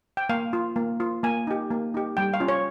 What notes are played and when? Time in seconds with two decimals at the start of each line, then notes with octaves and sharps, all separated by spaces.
0.17 G5
0.29 A#3 F5
0.53 F4
0.76 A#3
1.00 F4
1.23 A#3 G#5
1.47 D#4 G4
1.71 A#3
1.94 D#4 G4
2.17 G3 G5
2.34 F5
2.40 C#4 F4
2.48 C#5